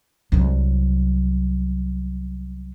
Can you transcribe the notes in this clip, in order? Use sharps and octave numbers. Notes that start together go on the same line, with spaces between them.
C2 F#3